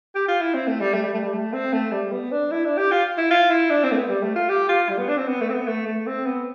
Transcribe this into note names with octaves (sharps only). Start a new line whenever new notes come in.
G4
F4
E4
C4
A3
G3
A3
G3
A3
G3
A3
C4
A3
G3
B3
D4
E4
D4
G4
F4
E4
F4
E4
D4
C4
A3
B3
G3
A3
F4
G4
F4
G3
B3
D4
C4
B3
A3
C4
B3
A3
A3
C4
B3